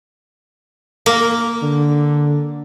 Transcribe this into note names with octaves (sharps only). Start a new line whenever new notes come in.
A#3
D3